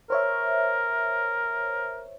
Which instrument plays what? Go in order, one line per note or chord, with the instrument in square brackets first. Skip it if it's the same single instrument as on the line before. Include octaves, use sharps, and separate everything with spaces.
[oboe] A#4 [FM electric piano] C5 C#5 E5